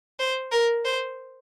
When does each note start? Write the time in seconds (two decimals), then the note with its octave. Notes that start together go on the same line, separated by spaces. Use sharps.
0.19 C5
0.52 A#4
0.85 C5